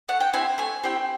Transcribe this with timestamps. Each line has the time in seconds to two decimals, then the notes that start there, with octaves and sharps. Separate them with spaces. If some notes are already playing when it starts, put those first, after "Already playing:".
0.09 A3 F#5
0.20 G5
0.33 C4 E4 G4 G#5
0.58 A3 G#5
0.84 C4 E4 G4 G5